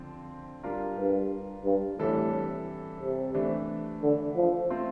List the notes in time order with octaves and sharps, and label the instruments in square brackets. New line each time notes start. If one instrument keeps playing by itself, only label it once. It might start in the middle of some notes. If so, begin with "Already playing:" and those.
Already playing: [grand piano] D3 F3 C4
G3 D4 F4 A#4
[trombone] G2
G2
[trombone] A2 [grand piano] C3 E3 G3 D4 A4
[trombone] C3
[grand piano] E3 A3 D4
[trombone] D3
F3
[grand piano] A3 C4 F4